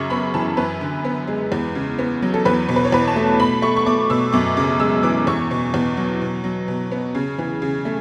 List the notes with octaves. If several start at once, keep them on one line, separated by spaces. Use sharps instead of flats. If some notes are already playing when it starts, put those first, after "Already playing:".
Already playing: F#2 C#3 C#6 D6
B3 B5
E3 A5
F#2 B4
D3
B3
G#3
E2
C#3
B3
F#3
A4
E2 B4
B2
B4
C#5
E2 B4
A5
A3
B2 B5
A3 C#6
C#6
A3 D6
B2 E6
F#2 D6
C#3 D6
G#3 E6
E3 D6
E2 C#6
B2
E2
F#3
B2
F#3
B2
B3
C#3
E3
C#3
A3